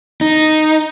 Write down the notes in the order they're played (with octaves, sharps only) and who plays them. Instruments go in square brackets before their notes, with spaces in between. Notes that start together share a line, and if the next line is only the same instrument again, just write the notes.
[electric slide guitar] D#4